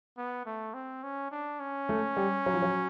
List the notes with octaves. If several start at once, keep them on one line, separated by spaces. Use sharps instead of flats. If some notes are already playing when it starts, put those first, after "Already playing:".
B3
A3
C4
C#4
D4
C#4
A3
G3
F#3
F3
F#3